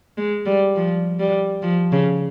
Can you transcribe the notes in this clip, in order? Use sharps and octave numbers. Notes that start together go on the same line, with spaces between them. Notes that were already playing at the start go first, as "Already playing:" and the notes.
G#3
G3
F3
G3
F3
C#3